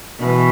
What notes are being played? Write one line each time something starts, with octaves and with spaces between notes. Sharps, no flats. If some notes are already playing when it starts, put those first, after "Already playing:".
B2 E3